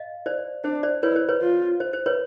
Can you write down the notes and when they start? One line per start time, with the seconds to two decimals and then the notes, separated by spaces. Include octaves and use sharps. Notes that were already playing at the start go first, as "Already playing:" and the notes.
Already playing: D#5 F5
0.26 C5 D5
0.64 D4 C5
0.83 C5 D5
1.03 E4 B4 C#5
1.16 C5
1.29 B4 C#5
1.42 F4
1.80 C5
1.93 C5
2.06 B4 C#5